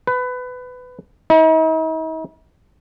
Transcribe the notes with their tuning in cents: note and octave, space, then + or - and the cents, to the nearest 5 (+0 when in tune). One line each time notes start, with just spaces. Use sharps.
B4 +20
D#4 +45